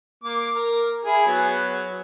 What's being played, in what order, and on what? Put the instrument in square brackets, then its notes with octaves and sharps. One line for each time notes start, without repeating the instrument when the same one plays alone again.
[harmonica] A#3 D6
A#4
E4 G#4
F#3 B3